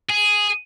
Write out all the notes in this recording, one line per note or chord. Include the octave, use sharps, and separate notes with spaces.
G#4